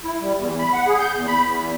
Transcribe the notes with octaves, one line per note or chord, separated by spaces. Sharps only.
E4
G3
E2
B5
F#5
G#4
G6
E2
B5
E2